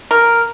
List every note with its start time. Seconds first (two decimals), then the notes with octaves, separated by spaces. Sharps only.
0.11 A#4